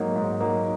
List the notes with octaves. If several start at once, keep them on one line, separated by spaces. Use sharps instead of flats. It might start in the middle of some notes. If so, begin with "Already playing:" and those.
Already playing: G#2 F#3 A#3 D#4
G#2
F#3 A#3 D#4